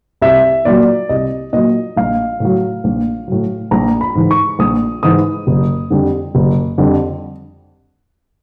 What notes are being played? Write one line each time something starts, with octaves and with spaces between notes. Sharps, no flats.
C2 E5
A#2 F#3 D5
C2 D#5
A#2 F#3 D#5
A#1 F5
A2 F#3
A#1
A2 F#3
A#1 A#5
B5
G#2 E3
C#6
A#1 D#6
G#2 E3 D#6
F#1
F2 D3 G3
F#1
F2 D3 G3